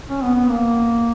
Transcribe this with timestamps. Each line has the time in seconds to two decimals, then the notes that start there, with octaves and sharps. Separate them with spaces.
0.08 C#4
0.22 B3
0.35 B3
0.48 A#3